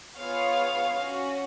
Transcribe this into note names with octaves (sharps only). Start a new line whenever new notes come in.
B3 F4 G#4 C#5 F5
C#4 F#4